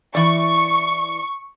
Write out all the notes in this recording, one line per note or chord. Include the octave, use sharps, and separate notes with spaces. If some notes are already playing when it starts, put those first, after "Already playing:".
E3 D5 C#6